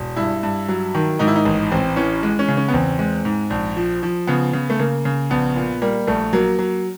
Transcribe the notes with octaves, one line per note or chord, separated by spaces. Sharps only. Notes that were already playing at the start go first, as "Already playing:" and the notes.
Already playing: E1
G2 E4
G2
F#3
D#3
G#2 D#4
E4
D#4
A1
A1 C4
E3 C#4
G#3
C#4
C#3
C#4
B3
E2 C4
G#3
G#2
A#1
F3
F3
C#3 B3
C#3
A3
C#3 A#3
C#3
A#1 B3
A#2
G3 A#3
A#1 A3
F#3 A#3
F#3